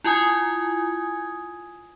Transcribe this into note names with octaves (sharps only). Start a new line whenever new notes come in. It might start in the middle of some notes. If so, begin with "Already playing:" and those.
E4 F4 G#5 D#6 G#6